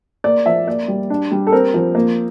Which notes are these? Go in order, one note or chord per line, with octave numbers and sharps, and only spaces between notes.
A#3 D5
F3 E5
A#3 D5
G3
D4
G3
A4
C4 A#4
F3
A#3